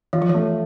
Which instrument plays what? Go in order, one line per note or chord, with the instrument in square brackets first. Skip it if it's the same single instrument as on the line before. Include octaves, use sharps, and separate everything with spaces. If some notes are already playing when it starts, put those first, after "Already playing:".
[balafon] E3 [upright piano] F4
[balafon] F3
[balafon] E3 [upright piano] A3